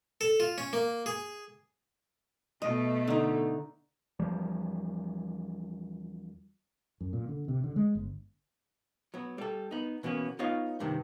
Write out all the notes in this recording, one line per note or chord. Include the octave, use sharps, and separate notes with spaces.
A4
F4
C#4
A#3
G#4
B2 A3 D#5
D3 D#4
E2 F3 G3
F#2
A#2
D3
C3
D3
G#3
G1
F#3 B3
G3 A4
B3 D#4
B2 E3 A#3 B3 C#4
B3 D#4 F4 C#5 D#5 F5
E2 G2 C3 D#3